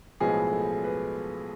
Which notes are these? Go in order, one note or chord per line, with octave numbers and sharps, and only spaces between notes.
B1 A2 F3 G#3 B3 G#4
A4
B4